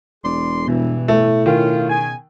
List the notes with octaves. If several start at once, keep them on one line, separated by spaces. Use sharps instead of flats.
E1 G#4 D5 C6
G2 B2 E3
A2 A3
D#3 C#4 F4
C#3 D#5 G#5